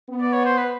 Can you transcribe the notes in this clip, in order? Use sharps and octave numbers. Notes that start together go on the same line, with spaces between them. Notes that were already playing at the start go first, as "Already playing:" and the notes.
B3
D5
C#5
C5
B4